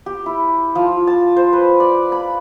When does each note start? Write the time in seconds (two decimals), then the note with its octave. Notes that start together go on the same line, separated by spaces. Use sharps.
0.06 G4
0.26 E4
0.75 F3
1.07 A5
1.36 C5
1.53 B4
1.80 D5
2.12 B5